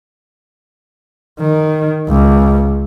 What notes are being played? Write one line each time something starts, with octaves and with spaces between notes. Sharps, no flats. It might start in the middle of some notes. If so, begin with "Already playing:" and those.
D#3
C#2